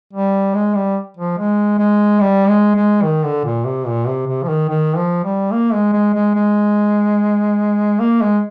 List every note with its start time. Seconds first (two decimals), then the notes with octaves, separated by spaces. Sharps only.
0.14 G3
0.55 G#3
0.75 G3
1.17 F3
1.38 G#3
1.79 G#3
2.21 G3
2.48 G#3
2.76 G#3
3.03 D#3
3.24 D3
3.45 A#2
3.65 C3
3.87 A#2
4.08 C3
4.27 C3
4.43 F3
4.49 D#3
4.70 D#3
4.97 F3
5.24 G3
5.52 A#3
5.73 G#3
5.93 G#3
6.14 G#3
6.35 G#3
8.00 A#3
8.22 G#3